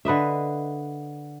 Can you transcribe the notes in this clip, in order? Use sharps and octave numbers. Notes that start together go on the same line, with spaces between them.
D3 B4 D#5 E5